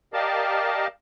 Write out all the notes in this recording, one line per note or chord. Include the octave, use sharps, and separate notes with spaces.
G4 A#4 D5 D#5 F5 A5